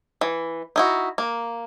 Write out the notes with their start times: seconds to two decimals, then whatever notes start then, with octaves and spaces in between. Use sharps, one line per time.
0.21 E3
0.76 D#4 E4 F#4
1.18 A#3